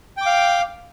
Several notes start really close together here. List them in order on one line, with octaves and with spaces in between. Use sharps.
G5 D6 F5